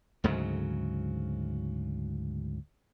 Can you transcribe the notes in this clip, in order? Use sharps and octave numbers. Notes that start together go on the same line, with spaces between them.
D2 G#2 C#3 F#3